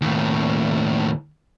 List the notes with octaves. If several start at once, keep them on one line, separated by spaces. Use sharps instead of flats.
D#2 A2